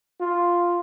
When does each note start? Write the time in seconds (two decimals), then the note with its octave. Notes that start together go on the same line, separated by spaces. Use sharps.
0.20 F4